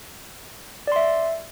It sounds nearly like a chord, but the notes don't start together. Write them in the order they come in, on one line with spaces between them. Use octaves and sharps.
D5 C6 E5